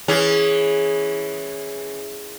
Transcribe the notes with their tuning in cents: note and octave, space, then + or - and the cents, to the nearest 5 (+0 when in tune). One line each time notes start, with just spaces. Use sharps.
E3 -5 C#4 +0 G#4 +0